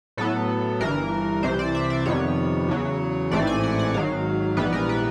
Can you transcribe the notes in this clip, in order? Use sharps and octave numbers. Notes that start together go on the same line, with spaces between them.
A2 F#3 B3 A4
G1 G2 E3 A#4
C2 C3 E3 C5
D5
E5
D5
F2 C3 D#3 G3 B3 C#5
E2 C#3 F#3
A1 G#2 E3 A3 C4 D5
G#5
F#5
F#5
G#1 G#2 D#3 F#3 F5
A#1 G#2 E3 G3 B3 B4
A#4
B4